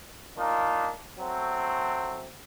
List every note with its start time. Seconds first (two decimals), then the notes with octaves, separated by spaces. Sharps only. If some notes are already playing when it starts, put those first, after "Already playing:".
0.38 A#3 D4 D#4 F4
1.20 F#3 A3 C4